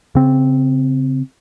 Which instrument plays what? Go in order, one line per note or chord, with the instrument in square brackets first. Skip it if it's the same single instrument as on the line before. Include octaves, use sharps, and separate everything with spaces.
[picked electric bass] C#3 C4